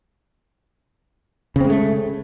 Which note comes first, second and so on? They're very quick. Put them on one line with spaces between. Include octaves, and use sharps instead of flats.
C#3 C4 G#3 A3